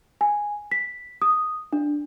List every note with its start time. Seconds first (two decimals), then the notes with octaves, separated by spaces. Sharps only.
0.21 G#5
0.72 B6
1.22 D#6
1.73 D4